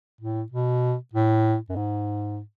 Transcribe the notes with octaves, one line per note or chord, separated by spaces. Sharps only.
A2
B2
A2
F#2
G#2